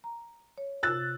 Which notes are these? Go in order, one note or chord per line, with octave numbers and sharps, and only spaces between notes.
A#5
C#5
C3 F4 E6 F#6 A6